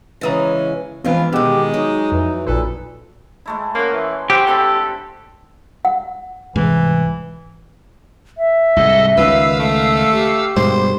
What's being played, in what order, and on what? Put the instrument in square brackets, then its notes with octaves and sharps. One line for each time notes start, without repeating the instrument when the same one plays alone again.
[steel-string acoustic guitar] C#3 E3 G#3 [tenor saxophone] C#4 [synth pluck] A#5 D#6 A6
[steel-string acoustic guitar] F2 G#2 D4 [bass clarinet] E3 [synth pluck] B3 C4 [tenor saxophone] F4
[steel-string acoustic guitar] B2 D#3 [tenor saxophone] G#3 [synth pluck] B3 F#5 E6 [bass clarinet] G4
[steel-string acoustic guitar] F#3 [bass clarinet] D#4
[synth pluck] F2 [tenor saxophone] E3
[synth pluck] A#1 B4 [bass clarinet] A#2 [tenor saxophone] A4
[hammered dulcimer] G#3 A3 E4
[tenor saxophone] A#3 [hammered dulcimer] C#4 F#5
[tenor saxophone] E3
[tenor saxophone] C4 [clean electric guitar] G4 [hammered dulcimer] F#5
[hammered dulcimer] D3 C4 B5 [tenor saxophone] A4
[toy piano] F#5
[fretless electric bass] C2 G#2 [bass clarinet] E3
[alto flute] E5
[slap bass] C2 G#2 [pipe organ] A4 D#5
[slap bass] C#2 D#3 [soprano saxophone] B4 [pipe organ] F5 E6
[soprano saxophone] A3
[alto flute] G4
[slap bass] G2 B2 G#3 [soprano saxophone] C5